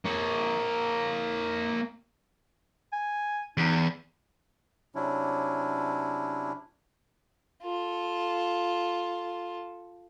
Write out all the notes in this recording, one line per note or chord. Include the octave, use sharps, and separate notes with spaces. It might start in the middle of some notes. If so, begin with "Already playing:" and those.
A#3 C#5
G#5
E2 D#4
C3 F#3 C#4 D4 E4
F4 A4